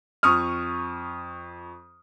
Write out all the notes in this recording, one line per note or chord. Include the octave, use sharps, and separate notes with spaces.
F2 C#6 D#6 F6